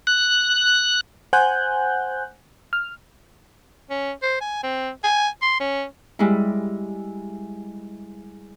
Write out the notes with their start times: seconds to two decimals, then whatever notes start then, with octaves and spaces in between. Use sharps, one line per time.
0.07 F#6
1.33 C5 F#5 G#5 F#6 G6
2.73 F6
3.90 C#4
4.22 C5
4.41 G#5
4.63 C4
5.04 G#5
5.42 C6
5.60 C#4
6.19 G3 G#3 E4